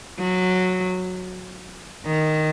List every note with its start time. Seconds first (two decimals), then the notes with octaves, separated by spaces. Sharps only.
0.19 F#3
2.06 D#3